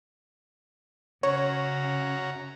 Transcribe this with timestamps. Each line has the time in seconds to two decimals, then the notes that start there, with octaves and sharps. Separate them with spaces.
1.23 C#3 C#4 F#4 C#5 A#5